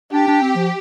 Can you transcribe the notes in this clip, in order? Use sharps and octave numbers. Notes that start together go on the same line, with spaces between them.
D4 G4
D4
C4
F3